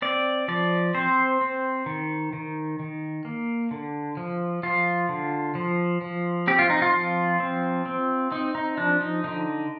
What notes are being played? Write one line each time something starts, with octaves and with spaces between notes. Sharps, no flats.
C4 D5
F3 D5
C4 C5
C4
D#3
D#3
D#3
A#3
D3
F3
F3 F4
D3
F3
F3
C4 G4
F4
D#4
F4
F3
C4
C4
C4 D#4
D#4
F3 D4
D#4
D3 D#4